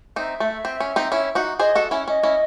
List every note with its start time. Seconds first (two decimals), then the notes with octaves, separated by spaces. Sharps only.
0.16 C4 D#4 E5
0.40 A3
0.65 C4
0.80 C#4
0.96 C4 D#4
1.12 C#4 E4
1.35 D#4 F#4
1.59 G#4 C5 D#5
1.75 F#4 A4
1.91 C#4 E4
2.07 C#4 D#5
2.23 C#4 E4